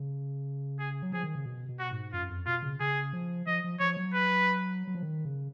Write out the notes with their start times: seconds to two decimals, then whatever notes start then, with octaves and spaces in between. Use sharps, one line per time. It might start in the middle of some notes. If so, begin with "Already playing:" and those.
Already playing: C#3
0.79 G#4
1.02 F#3
1.12 F3 G#4
1.23 D#3
1.35 C#3
1.46 B2
1.69 B2
1.79 F#4
1.91 G#2
2.13 F#2 F4
2.30 F2
2.46 B2 F4
2.63 C#3
2.80 C#3 G#4
3.13 F3
3.46 F3 D#5
3.64 F3
3.80 F3 C#5
3.97 F#3
4.14 B4
4.87 F#3
4.95 F3
5.03 D#3
5.25 C#3